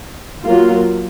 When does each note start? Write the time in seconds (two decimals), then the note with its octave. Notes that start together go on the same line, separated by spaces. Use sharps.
0.44 F#3 A#3 F4